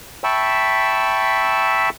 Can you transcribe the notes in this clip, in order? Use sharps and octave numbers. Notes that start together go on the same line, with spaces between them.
E5 G5 A5 B5 C#6 E6